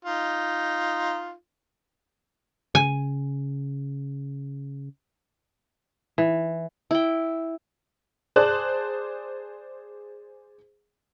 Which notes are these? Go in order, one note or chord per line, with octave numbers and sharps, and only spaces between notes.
D#4 F4
C#3 G#5
E3
E4 G5
G#4 C5 D5 A5 F#6